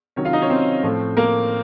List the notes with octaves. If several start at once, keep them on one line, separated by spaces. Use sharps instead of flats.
C3 D#3 F#3 C#4 C#5
F4 F5
D#4 D#5
C#4 C#5
C4 C5
A2 F3 A3
A#3 A#4